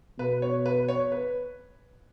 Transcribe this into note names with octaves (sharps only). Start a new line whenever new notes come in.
B2 B4
C#5
B4
C#5
B4